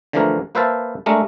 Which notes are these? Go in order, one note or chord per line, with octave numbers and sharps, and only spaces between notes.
D3 E3 F3 A3 D4 A#4
A#3 B4 C5 E5 F5 A5
G#3 A3 D4 A#4